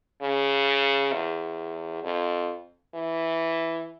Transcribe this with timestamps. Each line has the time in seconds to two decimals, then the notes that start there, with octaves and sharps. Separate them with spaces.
0.22 C#3
1.13 E2
2.04 F2
2.95 E3